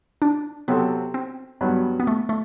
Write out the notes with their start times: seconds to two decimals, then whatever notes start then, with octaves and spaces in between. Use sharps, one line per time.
0.22 D4
0.68 C3 F#3 B3 C4 F#4 A4
1.14 C4
1.61 G2 F#3 B3
2.00 B3
2.07 A3
2.29 A3